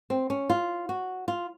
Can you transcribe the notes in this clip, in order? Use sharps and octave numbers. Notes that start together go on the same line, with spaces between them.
C4
C#4
F4
F#4
F4